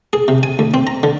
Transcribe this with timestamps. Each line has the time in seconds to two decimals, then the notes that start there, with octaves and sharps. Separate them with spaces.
0.13 G#4
0.28 C3
0.43 G#5
0.59 D2
0.74 C4
0.87 A#5
1.03 D3